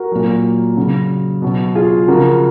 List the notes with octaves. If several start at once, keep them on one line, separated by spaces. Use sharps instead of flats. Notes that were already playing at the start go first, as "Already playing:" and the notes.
Already playing: F#4 A#4
A#2 F#3
C#3 F#3
B2 F#3
F4 G#4
C#3 F3 F#4 A#4